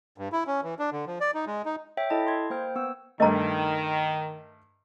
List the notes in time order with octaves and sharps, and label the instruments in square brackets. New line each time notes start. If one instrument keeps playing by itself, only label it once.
[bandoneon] G2
E4
C#4
E3
D4
D3
F3
D5
D#4
G#3
D#4
[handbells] C#5 E5 G5
E4 A4 D#5 A5
C6 G#6
A#3 C5 G5 F6
B3 E6
[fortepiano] G2 A3 [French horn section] D#3 [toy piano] D#5 A#5